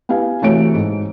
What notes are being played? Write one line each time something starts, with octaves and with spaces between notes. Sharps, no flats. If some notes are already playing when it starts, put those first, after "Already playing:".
B3 E4 G4 F5 G#5
C3 E3 A3 F#4 C#5 D7
G#2